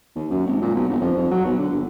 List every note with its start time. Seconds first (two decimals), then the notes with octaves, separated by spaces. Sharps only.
0.16 D#2
0.30 F#2
0.47 G#1
0.62 A#2
0.75 B1
0.89 G1
1.01 F2
1.17 F2
1.31 F#3
1.45 B1
1.58 D3
1.71 G1